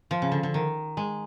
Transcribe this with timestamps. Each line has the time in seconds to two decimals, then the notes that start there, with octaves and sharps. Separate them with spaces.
0.11 F3
0.22 C#3
0.32 D3
0.43 D3
0.54 D#3
0.97 G#3